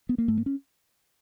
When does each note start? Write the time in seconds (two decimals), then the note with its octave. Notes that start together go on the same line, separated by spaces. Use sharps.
0.09 B3
0.18 A#3
0.28 G#2 A3
0.37 A#3
0.46 C#4